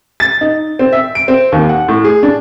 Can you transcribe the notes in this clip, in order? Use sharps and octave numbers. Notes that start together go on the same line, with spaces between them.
A6
D#4
C4
E5
D7
C4
D#2
F#5
A2
G#4
D4